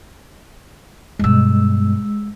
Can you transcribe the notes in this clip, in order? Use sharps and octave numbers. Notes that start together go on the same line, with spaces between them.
G2 B2 G#3 E6